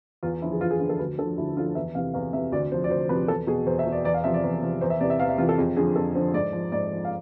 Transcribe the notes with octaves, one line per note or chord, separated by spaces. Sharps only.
E2 F4
D3 F3 E4
G#4
E2 F4
G#4
D3 F3 F4
A4
D2 B4
D3 F3 A4
D2 E4
D3 F3 F4
E2 E5
C3 E3 F5
E2 F5
C3 E3 E5
D2 D5
C3 F3 C5
D5
D2 C5
C3 F3 B4
E2 A4
B2 G#4
E2 C5
E5
B2
D5
E2 D5
F5
C3 F3 E5
D5
E2
C3 F3
E2 C5
E5
C3 E3 D5
E5
E2 F5
E5
C3 E3 F4
A4
F2 G#4
D3 F3 G#4
F2 A4
D3 F3 C5
G#2 D5
F3
G#2 D5
F3
F5